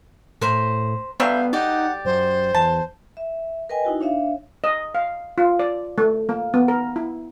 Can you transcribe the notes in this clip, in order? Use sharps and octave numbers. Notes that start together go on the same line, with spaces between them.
A2 A#4 C5 B5
D3 F#3 G3 B3 E5 F5 G5 B5
D#4 G4 D5 F#5
F#2 C5
E2 A5
E5
A#4 B4 D#5 G5 G#5
D#4 E4 F#4
D4 C#5 E5 F5
D#5
F5
F4
D5
A3
A#3
B3
A#4
E4